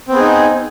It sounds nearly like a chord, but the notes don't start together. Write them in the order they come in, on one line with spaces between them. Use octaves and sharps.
C4 B3 G#4 D#4